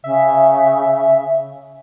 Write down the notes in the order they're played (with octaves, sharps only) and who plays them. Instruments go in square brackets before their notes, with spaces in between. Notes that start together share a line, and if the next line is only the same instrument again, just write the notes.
[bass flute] C#3 [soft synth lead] E5